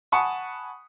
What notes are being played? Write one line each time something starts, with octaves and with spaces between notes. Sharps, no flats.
F#5 G#5 A5 B5 C#6 D#6